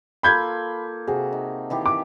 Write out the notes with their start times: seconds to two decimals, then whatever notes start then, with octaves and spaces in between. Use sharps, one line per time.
0.23 A#3 F4 A4 B5 G6 G#6
1.07 C3 F#4 G#4
1.33 D#4
1.70 D#3 E3 G4
1.86 D6